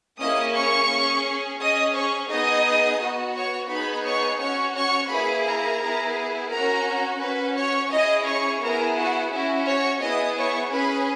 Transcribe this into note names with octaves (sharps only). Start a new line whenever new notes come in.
A#3 C#4 E4 G#4 D#5 D#6
C#5 C#6
C#4 G#4
C#4 G#4 D#5 D#6
C#5 C#6
B3 D#4 G#4 D#5 D#6
B3 F#4
C#5 C#6
B3 D#4 G#4 B4 B5
C#5 C#6
C#4 F#4 C#5 C#6
C#5 C#6
A#3 E4 G#4 B4 B5
A#4 A#5
B3 E4 G#4
C#4 F#4 A#4 A#5
C#4 F#4 B4 B5
C#5 C#6
C#4 E4 G#4 D#5 D#6
C#5 C#6
B3 E4 G#4 A#4 A#5
F#4 F#5
C#4 E4 F#4 E5
C#5 C#6
B3 E4 G#4 D#5 D#6
C#5 C#6
C#4 G#4 B4 B5